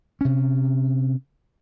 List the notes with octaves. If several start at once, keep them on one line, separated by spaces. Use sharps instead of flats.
C3 C#4